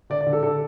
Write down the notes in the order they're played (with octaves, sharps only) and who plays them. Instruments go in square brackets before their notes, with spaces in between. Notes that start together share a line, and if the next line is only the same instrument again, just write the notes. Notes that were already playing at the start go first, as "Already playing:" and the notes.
[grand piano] D3 D5
D5
D3
A4
D3 A4